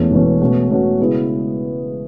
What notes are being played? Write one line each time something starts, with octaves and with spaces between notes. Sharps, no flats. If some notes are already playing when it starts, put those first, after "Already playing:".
Already playing: E1 E2 B2 A3 C#4
E1 E2 B2 A3 C#4
B2 A3 C#4 F#4
B2 A3 C#4 F#4
C#3 G#3 B3 E4